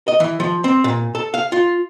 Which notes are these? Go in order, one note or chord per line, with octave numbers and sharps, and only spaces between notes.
D#5
E3
F3
C4
A#2
A4
F5
F4